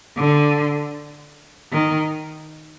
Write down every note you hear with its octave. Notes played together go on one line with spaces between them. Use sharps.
D3
D#3